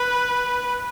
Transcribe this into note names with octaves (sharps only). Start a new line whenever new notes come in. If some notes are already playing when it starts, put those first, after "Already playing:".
Already playing: B4